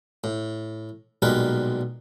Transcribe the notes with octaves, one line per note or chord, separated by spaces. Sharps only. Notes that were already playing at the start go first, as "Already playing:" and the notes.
A2
B1 A#2 G3 G#3 A#4 B4